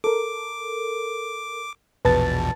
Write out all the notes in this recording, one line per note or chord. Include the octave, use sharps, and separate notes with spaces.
A4 A#4 D6
A#1 E2 B2 B4 A5 A6